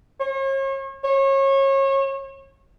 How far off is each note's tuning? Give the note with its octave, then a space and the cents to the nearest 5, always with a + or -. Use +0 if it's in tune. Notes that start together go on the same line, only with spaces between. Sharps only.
C#5 -40
C#5 -30